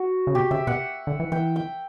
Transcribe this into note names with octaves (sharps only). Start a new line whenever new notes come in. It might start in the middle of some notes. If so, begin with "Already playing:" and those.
Already playing: F#4
C#3
B2 G4
C#3 E5
B2 F#5
D3
E3
E3 G5
G5